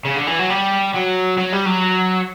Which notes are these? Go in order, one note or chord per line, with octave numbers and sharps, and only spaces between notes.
C#3
D3
E3
F#3
G3
F#3
F#3
G3
F#3